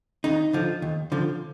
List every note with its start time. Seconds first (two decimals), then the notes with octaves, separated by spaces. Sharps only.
0.24 D#2 D#4
0.53 D3 F3
0.82 D#2
1.12 D3 F3